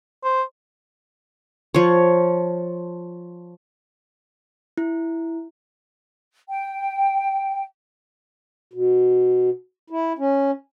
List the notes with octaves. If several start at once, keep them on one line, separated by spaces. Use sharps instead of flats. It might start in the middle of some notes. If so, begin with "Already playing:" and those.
C5
F3 C#5
E4
G5
B2
E4
C#4